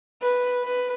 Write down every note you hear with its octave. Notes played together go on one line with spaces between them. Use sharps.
B4
B4